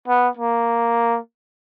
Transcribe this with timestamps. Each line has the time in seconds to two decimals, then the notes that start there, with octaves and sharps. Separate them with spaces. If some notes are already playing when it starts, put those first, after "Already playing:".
0.08 B3
0.37 A#3